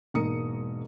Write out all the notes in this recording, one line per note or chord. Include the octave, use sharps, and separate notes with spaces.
E1 G#2 A#3 A#5 D#6 C#7